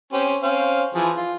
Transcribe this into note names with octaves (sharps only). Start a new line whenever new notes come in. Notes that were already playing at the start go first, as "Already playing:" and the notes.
C4 C#4 G4
C4 C#4 F5
E3 F3 G#4
F4